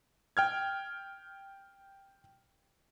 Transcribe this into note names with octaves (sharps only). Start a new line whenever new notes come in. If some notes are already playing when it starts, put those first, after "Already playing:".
G5 F6 G#6